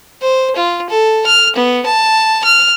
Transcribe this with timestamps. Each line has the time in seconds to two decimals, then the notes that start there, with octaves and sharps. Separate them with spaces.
0.22 C5
0.56 F4
0.90 A4
1.26 F6
1.56 B3
1.86 A5
2.44 F6